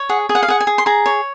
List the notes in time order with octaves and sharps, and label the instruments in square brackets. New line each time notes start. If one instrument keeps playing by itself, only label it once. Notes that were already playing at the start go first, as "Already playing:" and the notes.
Already playing: [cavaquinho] C#5
G#4 F#5
G#4
F#5
F5
G#4 F#5
G#5
G#4
C6
G#4 A#5
C#5